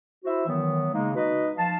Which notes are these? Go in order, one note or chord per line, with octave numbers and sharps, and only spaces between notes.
E4 F#4 C5 E5
D#3 E3 F#3 B3
C#3 G#3 A#3 D#4
D#4 F#4 B4 D#5
F3 F5 A5